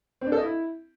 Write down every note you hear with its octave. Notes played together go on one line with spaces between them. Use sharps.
C4
D4
A4
D#5
E4